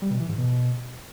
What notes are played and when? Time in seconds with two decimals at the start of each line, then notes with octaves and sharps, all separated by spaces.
0.02 G3
0.11 B2
0.20 E3
0.29 G#2
0.38 B2